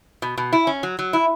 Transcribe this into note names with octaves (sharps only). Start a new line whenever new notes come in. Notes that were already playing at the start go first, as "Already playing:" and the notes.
B2
B2
E4
C#4
F#3
F#3
E4